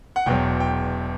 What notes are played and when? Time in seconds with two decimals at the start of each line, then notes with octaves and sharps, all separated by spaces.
0.16 F#5
0.26 E1 E2 B2 F#3 G5
0.60 G5